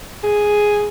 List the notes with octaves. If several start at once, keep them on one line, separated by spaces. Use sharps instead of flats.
G#4